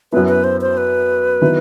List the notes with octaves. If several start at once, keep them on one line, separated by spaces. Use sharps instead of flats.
F#2 F#3 B3 E4 B4
B4
C5
C5
B4
D#3 F#3 B3 E4